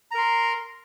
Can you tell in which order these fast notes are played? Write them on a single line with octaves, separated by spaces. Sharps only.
A#5 A#4 C6